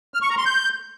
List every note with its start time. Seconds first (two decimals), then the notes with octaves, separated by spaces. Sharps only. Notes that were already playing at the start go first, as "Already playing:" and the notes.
0.14 F6
0.22 C#6
0.30 A#5
0.37 C6
0.45 G6